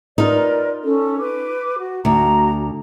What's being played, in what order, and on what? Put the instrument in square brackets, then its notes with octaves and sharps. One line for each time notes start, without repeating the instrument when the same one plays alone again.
[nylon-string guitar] D#4 F4 [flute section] A#4 B4 D5
[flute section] C#4 A4
B4 D6
F#4
[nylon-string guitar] D2 [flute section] F#4 A#5